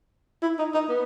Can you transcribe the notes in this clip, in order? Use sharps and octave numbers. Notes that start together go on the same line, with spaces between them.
E4
D#4
D#4
B3